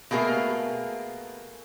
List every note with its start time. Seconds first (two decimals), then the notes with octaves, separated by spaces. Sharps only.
0.11 B2 A3 A#3 G#4 A#4